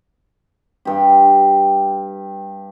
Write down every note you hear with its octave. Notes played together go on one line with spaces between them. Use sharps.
G2 G4